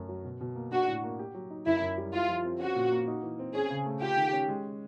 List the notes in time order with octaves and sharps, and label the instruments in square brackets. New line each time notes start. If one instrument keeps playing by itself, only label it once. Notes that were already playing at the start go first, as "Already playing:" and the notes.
Already playing: [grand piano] F#2 A3
F#3
B2
B2
A#3
[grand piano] D4 [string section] F#4
[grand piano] A2
A#3
G4
F#3
D#4
[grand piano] F#2 [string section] E4
[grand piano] F#2
G3
[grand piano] E4 [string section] F4
[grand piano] F3
C4
[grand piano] C#4 [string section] F#4
[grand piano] A#2
A#3
D#4
E3
C4
[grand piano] C#4 [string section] G#4
[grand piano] C#3
A3
[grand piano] F4 [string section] G4
[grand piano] D#3
C#4
G#3